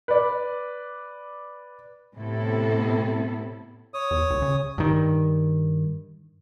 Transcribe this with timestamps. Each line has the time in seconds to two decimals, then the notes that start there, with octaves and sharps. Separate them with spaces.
0.08 B4 D5
2.16 A2 C3 B3 C4 E4 A4
3.94 C#5 D#6
4.11 E2
4.30 C#2
4.42 C#3
4.78 G2 D#3